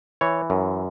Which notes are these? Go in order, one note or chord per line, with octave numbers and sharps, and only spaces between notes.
E3 C#5
F#2